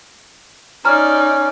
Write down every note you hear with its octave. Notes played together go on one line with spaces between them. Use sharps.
C#4 D#4 D5 A#5 F6